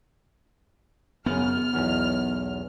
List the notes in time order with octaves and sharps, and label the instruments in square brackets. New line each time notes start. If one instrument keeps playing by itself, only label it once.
[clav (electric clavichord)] F#2 C#3 [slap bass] B3 [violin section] F6
[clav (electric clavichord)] B1 E2 F#3